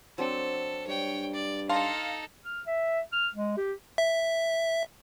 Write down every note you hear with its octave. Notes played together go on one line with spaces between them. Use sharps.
F#3 C4 D4 A4
G2 C#5 G5
D5
D#4 A4 F5 A5 C6
F6
E5
F6
G#3
G4
E5